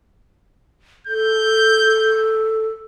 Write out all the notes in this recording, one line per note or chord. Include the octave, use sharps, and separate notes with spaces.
A4 G6